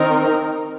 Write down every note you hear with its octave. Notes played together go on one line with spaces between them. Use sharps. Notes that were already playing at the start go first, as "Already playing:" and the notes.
Already playing: D#3 C4 D#4 A#4